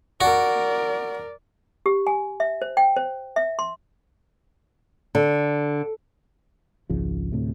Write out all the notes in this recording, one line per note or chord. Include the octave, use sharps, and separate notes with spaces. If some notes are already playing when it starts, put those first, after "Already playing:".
F#4 A#4 D5
G4
G#5
E5
C5
G5
C5
E5
C6
D3
G#1 C#2 C#3 F3
D2 A2 C3